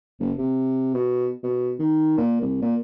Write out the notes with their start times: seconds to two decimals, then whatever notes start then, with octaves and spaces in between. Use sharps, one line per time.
0.20 F#1
0.38 C3
0.94 B2
1.43 B2
1.79 D#3
2.17 A#2
2.41 C2
2.62 A#2